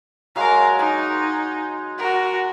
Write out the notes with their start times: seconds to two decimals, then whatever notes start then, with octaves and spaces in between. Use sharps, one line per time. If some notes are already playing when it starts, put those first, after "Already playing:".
0.36 F#3 G#3 G#4 A#4 F5
0.79 D#4 G#5
1.98 F#4 A#4